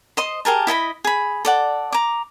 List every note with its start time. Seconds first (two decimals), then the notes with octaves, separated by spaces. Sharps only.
0.17 C5 D#5 C6
0.45 G4 G#4 A#4 A5
0.67 E4 D#5 G#5 B5
1.04 G#4 B5
1.45 A4 D5 F#5
1.92 A#5 D6